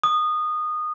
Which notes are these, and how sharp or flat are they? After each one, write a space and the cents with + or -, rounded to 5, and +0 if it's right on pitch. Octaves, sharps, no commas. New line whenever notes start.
D#6 -20